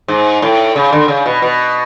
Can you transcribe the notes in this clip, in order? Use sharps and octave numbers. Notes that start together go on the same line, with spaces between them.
G#2
A2
C#3
D3
C#3
B2
B2